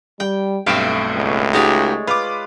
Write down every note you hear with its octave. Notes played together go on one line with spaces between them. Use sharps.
G3 G5
B1 G2 A3 C4 E5 F5 D7
C#2
G#3 D#4 F#4 G4 C#5 D5
F4 B4 D6